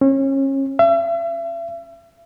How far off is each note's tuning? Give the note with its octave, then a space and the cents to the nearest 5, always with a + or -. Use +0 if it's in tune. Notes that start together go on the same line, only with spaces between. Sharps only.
C#4 -30
E5 +40